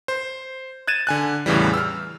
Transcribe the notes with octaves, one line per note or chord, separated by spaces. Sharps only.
C5
F#6 G#6 A6 D#7 E7
D3 G#5 F#6
E2 A2 C#3 E3 G3
E6 F6